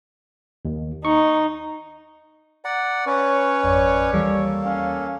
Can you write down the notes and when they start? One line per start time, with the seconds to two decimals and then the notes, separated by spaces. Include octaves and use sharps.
0.65 D#2
1.05 D#4 C#6
2.65 D5 F#5 A#5
3.07 C#4 B4 C#5 C#6
3.64 G#1 F2 D5
4.13 D#2 E3 G3 A#3 A4
4.65 C#4 F5